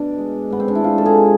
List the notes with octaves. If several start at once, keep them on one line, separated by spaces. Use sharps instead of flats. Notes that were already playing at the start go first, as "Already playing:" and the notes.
Already playing: B2 D4
G#3
G#2 B3
C4
D4
E4
G#3 F4
A4
G#4
C3